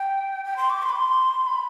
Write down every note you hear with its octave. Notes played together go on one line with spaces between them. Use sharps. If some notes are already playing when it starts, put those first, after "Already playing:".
Already playing: G5
G5
C6
D6
C6
B5
C6
B5